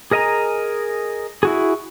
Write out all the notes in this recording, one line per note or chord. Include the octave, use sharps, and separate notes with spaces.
G#4 A#4 D#5 G#5 A#5
E4 F#4 G#4